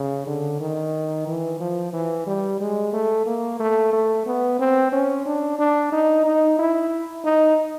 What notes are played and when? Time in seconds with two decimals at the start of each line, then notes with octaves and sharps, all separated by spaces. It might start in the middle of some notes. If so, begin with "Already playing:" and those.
Already playing: C#3
0.27 D3
0.60 D#3
1.27 E3
1.60 F3
1.93 E3
2.27 G3
2.60 G#3
2.93 A3
3.26 A#3
3.59 A3
3.93 A3
4.26 B3
4.59 C4
4.92 C#4
5.26 D4
5.59 D4
5.92 D#4
6.25 D#4
6.59 E4
7.25 D#4